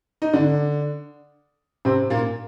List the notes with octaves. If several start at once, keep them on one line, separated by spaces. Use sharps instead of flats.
D#4
D3 D4
C3 C4
A#2 A#3